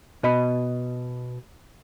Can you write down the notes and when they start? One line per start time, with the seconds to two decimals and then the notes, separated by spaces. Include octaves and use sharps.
0.23 B2 D#5 B5